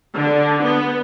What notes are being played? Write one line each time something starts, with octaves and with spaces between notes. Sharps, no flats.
D3
B3